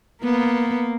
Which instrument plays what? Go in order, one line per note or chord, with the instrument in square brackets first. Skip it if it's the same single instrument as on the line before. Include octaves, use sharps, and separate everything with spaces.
[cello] A#3 [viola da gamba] B3